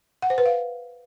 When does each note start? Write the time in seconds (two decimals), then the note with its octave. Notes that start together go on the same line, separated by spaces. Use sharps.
0.22 F#5
0.30 C5
0.38 B4
0.46 F5